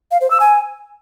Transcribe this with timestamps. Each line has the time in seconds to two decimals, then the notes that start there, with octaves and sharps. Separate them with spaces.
0.11 F5
0.21 C5
0.31 E6
0.40 G#5